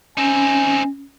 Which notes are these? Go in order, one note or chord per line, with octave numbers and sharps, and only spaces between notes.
C4 C#4 D#4 G#5